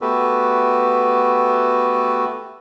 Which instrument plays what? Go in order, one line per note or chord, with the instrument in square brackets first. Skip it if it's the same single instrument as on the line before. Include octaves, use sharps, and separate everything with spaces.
[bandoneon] A3 B3 F#4 G4 A4 B4